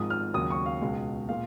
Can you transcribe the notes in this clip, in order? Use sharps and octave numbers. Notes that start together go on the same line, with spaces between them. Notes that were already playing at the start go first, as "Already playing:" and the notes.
Already playing: G#1 G#2 F3 G#3 D#6
F6
D#2 C#3 F#3 D#6
C#6
F5
C#2 B2 G#3
A#2 G#3 F5